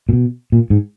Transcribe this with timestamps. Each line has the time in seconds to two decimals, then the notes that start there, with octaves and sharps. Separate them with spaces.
0.09 A#2
0.13 B2
0.52 A#2
0.70 G#2